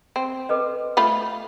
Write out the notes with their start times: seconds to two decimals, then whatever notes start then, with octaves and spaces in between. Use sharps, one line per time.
0.16 C4
0.49 A4 B4 D#5
0.97 A3 F4 B5